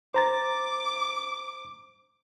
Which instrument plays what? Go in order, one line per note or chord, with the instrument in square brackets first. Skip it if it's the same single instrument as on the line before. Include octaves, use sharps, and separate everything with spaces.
[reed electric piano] C5 A#5 A6 [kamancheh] D6